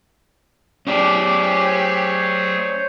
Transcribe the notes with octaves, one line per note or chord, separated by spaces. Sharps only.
F#3 A3 C#4 G4 G#4 D5
C5 C#5